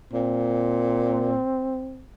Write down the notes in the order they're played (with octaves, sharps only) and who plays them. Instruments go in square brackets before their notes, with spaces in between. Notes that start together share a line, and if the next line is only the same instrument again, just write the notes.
[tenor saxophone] A#2 [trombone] C4